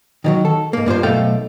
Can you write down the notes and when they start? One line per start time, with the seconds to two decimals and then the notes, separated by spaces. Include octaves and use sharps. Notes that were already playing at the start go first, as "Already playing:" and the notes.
0.24 D#3 E3 F#3
0.45 A4
0.73 G#2 A#3
0.86 G2 A#3 F4 C5
1.03 B1 A3 A4 F5 G5